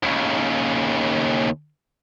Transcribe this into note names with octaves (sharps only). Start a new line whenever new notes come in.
D#2 C#3